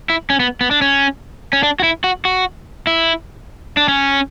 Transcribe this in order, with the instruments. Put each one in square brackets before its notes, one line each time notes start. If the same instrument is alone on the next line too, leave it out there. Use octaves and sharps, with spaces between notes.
[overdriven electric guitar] E4
C#4
B3
B3
D4
C#4
C#4
D4
F#4
E4
F#4
F#4
E4
D4
C#4